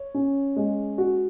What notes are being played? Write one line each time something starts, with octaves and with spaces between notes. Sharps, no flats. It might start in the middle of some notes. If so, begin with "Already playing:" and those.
Already playing: C#5
C#4
G#3
F#4